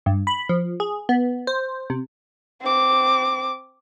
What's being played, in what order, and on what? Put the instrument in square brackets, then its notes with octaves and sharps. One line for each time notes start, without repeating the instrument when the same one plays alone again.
[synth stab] G2
B5
F3
G#4
B3
C5
C3
[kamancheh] C4 D6